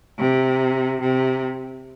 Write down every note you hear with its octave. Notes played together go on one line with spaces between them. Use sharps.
C3
C3